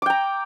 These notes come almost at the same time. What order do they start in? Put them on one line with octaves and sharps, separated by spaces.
D6 G5 A#5